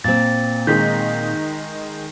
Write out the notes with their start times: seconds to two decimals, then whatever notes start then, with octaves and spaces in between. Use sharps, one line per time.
0.04 A#2 C4 A6
0.67 D#3 G#3 D#4 G6 B6